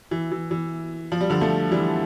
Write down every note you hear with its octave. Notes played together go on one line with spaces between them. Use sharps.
E3
E3
E3
F3
G3
D3 F3
F3 A3
E3 G3